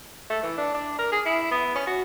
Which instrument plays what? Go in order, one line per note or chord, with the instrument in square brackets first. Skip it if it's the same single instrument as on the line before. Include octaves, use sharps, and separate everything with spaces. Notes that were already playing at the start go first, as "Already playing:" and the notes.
[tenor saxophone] A3
E3
D4
D4
A#4
G#4
E4
B3
C#4
F#4